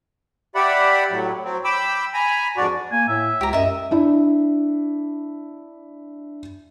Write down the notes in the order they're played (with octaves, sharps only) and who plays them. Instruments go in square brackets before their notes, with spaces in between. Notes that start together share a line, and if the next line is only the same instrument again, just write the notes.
[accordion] G4 D5 E5 F#5 B5
A2 F#3
F#3 C4
G5 B5 D6 E6
G#5 A#5 B5
F2 G#2 D4 F#4 D5
[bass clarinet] A#3 [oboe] G#5
[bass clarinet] A2 [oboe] E5
[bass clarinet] C#2 [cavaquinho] G4 A#5
[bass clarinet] F#2 [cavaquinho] D#5 E5
[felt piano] D4 E4